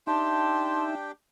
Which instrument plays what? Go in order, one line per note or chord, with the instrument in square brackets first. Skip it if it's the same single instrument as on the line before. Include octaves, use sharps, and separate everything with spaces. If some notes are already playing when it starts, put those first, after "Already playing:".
[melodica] D4 G4 G5 [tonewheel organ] D#4 E5 [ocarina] A5 [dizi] C6